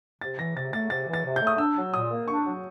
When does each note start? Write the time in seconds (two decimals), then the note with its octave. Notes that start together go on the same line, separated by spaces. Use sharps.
0.21 C3 A6
0.39 E3 A#6
0.56 C3 A6
0.73 A3 A6
0.90 C3 A6
1.08 E3
1.14 A6
1.24 C3
1.36 G6
1.41 A3
1.47 D#6
1.58 D4 E6
1.76 F#3
1.93 A#2 D#6
2.10 A#3
2.27 D4 C#6
2.44 F#3